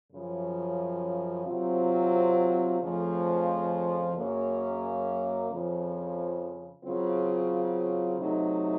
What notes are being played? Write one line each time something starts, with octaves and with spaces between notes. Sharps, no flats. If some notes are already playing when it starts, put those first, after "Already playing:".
F#2 C#3 F3
C3 F#3 C4 F4
F2 C#3 F3 A3
F#2 C#3 F#3 A#3 C#4
F2 C#3 F3
C#3 F#3 C4 F4
C3 F#3 A3 D#4